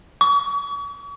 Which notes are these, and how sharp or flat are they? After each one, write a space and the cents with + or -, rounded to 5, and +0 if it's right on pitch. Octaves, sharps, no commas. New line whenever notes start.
C#6 +45